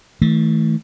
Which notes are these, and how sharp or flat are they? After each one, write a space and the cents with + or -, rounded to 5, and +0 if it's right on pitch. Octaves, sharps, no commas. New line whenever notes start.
E3 -45 A3 +0